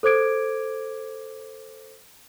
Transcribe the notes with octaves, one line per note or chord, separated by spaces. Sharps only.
A4 C5 D6 G#6 D7